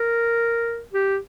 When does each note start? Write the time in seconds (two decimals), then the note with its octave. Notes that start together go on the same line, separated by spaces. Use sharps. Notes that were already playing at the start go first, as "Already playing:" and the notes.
Already playing: A#4
0.93 G4